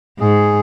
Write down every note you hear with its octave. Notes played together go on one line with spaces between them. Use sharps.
G#2 G#4